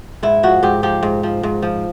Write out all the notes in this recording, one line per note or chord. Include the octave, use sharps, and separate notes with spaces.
G#2 E4
F3 F#4
G#2 G4
F3 G4
G#2
F3
G#2
F3